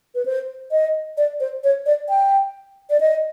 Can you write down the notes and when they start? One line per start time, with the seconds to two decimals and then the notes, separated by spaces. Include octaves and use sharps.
0.15 B4
0.25 C5
0.71 D#5
1.17 D5
1.40 C5
1.64 C#5
1.86 D5
2.09 G5
2.90 D5
3.00 D#5